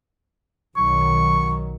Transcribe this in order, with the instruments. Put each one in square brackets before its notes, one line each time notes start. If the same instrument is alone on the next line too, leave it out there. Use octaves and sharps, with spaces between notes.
[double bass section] B1 D#3 F#3 [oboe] C#6